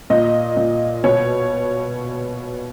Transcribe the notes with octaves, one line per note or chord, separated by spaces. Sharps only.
A#2 D#5
A#2
B2 C#5